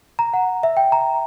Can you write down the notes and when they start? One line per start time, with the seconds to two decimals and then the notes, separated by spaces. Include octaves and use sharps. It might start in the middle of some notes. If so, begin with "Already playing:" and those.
0.19 A#5
0.33 F#5
0.63 E5
0.77 G5
0.92 A#5